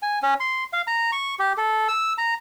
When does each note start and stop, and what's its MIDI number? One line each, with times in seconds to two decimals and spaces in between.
0.02 0.19 80
0.22 0.34 61
0.40 0.64 84
0.73 0.82 77
0.87 1.11 82
1.12 1.35 85
1.39 1.53 67
1.57 1.88 69
1.88 2.13 88
2.18 2.34 82